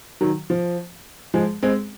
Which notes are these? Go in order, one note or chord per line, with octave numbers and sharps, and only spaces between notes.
D#3 F#3
F3
F3 G#3
G#3 C4